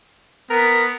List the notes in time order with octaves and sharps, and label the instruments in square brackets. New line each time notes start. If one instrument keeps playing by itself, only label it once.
[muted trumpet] B3 [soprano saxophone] A#4